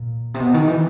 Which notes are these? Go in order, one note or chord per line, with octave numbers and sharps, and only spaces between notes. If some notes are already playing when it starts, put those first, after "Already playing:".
Already playing: A#2
C3
B2
D#3
E3